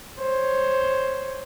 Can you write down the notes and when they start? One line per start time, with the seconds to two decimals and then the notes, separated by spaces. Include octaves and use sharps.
0.19 C5 C#5